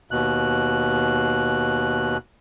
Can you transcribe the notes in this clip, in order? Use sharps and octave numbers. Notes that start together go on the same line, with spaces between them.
D#2 B2 F#6